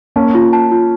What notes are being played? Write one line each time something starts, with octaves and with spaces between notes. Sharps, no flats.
A#3 C#4 A5
F4
A5
F4